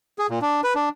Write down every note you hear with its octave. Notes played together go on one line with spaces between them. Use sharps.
G#4
A#2
D4
B4
D4